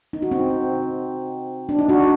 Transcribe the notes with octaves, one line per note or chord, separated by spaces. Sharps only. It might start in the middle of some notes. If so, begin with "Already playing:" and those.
D#4
F#4
C4 D#4
D4
D#4
D4 F#4